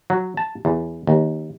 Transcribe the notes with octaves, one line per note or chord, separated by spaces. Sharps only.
F#3
A5
E2
D#2